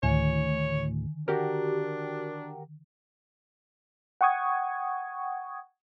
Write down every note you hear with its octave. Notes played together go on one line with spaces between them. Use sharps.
D2 A2 D3 D#3 C#5 G#5
D4 F#4 G4 A#4
F#5 G5 C#6 D#6 G#6